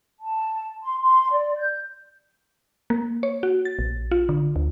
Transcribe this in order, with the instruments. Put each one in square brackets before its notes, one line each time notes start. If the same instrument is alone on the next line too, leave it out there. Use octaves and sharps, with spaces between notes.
[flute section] A5
C6
C6
D5
G6
[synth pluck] A#3
C#5
F#4
A6
A#1
F4
D3
D2